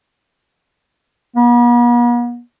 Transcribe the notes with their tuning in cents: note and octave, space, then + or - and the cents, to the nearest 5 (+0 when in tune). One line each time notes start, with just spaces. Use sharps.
B3 -45